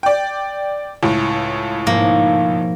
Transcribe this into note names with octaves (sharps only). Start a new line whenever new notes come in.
D5 G5
C#2 A2
G#2 B2 F3 A#3